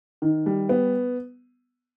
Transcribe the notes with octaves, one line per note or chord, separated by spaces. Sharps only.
D#3
G3
B3